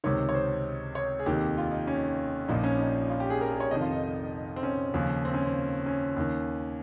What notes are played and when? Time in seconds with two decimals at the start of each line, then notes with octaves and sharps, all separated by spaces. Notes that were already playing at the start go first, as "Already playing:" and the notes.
0.04 C#2 C3 D#3 C#5
0.29 C#5
0.35 C5
0.95 C#5
1.19 G#4
1.26 F1 D#2 D#3 G4
1.57 F4
1.72 D#4
1.87 C#4
2.48 A#1 A#2 F3 D#4
2.64 C#4
2.79 D#4
3.09 F4
3.20 G4
3.30 G#4
3.41 A#4
3.51 G#4
3.60 C#5
3.71 F1 F2 D#3 D#5
3.81 F4
3.91 D#4
4.56 C4
4.63 C#4
4.94 D#2 C#3 F3
5.25 C4
5.34 C#4
5.45 C4
5.86 C#4
6.16 D#2 D#3